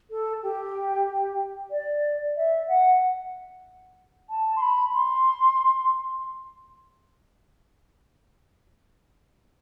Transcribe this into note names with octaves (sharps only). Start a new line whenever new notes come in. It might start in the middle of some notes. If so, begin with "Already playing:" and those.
A4
G4
D5
E5
F#5
A5
C6
B5
C6